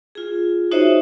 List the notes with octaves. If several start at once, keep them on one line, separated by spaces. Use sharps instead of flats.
F4 G#4
D#4 F#4 C5 C#5 D#5 E5